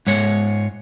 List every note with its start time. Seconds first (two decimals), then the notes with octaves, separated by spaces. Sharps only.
0.07 G#2 G#3 C#5